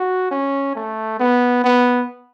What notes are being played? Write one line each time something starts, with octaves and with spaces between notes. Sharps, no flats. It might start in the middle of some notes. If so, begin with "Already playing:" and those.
Already playing: F#4
C#4
A3
B3
B3